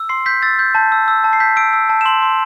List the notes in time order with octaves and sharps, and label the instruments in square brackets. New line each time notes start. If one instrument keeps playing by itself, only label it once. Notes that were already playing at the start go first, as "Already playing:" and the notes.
Already playing: [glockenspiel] E6
C6 C7
G6 B6
E6 A6
G6
A5 G6
E6
E6
A5
C7
G6 B6
E6 D7
E6
A5
E7
C6 F#7
C6